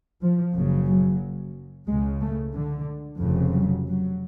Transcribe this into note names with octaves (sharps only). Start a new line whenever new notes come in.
F3
F#1 F#2 C#3
F#3
C#2 C#3 G#3
A3
D3
F1 F2 C#3
F#3
F#3